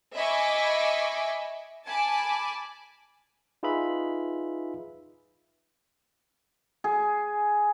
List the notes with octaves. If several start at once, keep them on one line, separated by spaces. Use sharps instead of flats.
D#5 E5 G#5 B5 C#6 D6
G#5 A5 B5 D6
D#4 F4 G#4 B4 E5 B5
G#4